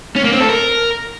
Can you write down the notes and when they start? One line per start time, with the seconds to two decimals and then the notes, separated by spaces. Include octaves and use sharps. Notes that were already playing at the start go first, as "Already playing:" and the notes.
0.16 C#4
0.24 A#3
0.33 C4
0.41 A4
0.49 A#4